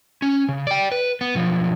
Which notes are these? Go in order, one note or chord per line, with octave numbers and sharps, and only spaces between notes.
C#4
C#3
D5 G5
B4
B3
B1 F3